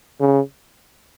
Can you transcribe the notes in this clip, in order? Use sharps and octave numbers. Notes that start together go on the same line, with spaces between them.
C#3